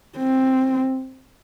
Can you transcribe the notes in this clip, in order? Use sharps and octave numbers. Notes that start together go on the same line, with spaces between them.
C4